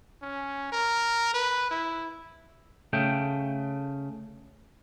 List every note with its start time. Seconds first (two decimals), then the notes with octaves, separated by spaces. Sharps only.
0.22 C#4
0.72 A#4
1.34 B4
1.71 E4
2.93 C#3 A3 G5